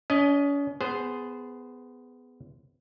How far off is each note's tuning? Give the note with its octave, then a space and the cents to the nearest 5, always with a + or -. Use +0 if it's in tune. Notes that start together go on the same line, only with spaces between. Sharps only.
C#4 +40 D#5 +0
B3 +15 G#4 +0 C5 -5